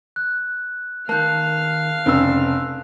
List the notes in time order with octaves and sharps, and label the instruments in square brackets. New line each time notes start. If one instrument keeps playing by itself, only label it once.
[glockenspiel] F#6
[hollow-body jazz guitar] D#3 A#3 [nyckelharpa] F5 [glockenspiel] A5 F#6 G6
[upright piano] F1 C#3 E6 [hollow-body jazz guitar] C4 D4